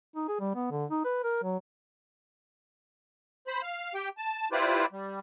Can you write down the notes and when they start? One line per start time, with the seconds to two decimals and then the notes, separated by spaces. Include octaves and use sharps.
0.15 D#4
0.28 G#4
0.40 G3
0.55 B3
0.71 D3
0.90 D#4
1.04 B4
1.23 A#4
1.43 F#3
3.47 C5 B5
3.62 F5
3.95 G4 G5
4.17 A5
4.52 E4 F4 G4 B4 C5 D5
4.93 G3